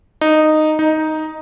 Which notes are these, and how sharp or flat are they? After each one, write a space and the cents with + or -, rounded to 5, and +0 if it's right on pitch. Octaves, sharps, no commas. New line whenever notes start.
D#4 -10
D#4 +5